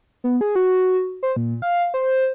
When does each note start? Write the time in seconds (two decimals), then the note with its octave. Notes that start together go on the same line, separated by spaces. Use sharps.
0.24 B3
0.41 G#4
0.55 F#4
1.23 C5
1.36 A#2
1.62 F5
1.94 C5